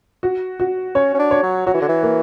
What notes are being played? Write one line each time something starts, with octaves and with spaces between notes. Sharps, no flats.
F#4
F#4
C#4 C#5
C#4
D4
C#5
F#3
F#3 F#4
E3
D3
E3
A#3